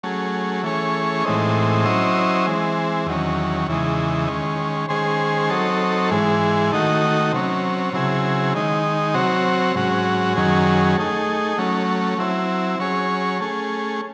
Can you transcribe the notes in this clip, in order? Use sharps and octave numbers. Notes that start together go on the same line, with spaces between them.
F#3 A3 C#4 G#4
E3 A3 C#4 G#4 C#5
A2 E3 G#3 C4 D#4
F#3 C#4 E4 C5 D#5
E3 G#3 C4
E2 D#3 F#3 C#4
E2 C#3 E3 G#3 D#4
D#3 G#3 C#4
D#3 G#3 C#4 G#4 C5
F#3 C4 D#4 A4 C#5
G#2 E3 G#3
D#3 A3 D#4 F#4
C3 F#3 C#4
C#3 F#3 C4 E4 G#4
D#3 G#3 D#4
C3 F#3 C4 F#4 C#5
G#2 F#3 C#4 F#4
F#2 D#3 F#3 C#4 G#4
A3 D#4 G#4
F#3 A3 C#4
F#3 C4 E4
F#3 C#4 G#4 C#5
A3 C#4 G#4